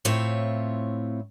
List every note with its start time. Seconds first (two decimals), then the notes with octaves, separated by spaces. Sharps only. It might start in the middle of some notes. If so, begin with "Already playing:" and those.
0.05 A2 C4 E4 F4 C#5